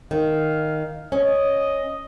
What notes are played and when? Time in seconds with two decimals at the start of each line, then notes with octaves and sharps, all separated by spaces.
0.11 D#3 F5
1.12 C#4 D#5